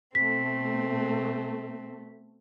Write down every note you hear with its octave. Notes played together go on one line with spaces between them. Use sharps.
B2 A3 C4 B6